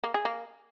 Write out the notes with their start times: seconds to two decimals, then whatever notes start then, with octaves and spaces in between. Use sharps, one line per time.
0.04 A#3
0.14 G#4
0.25 A#3